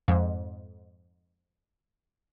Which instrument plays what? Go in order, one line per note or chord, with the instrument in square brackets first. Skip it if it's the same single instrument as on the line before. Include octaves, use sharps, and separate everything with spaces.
[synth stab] F2 G#2